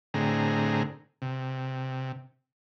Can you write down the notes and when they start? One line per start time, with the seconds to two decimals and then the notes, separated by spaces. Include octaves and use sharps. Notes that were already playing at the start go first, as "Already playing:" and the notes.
0.14 A2 D3 C4 G#4 A#5
1.22 C3